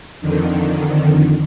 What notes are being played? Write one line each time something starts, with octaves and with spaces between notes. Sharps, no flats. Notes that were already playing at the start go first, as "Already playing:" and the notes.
F2 D3 D#3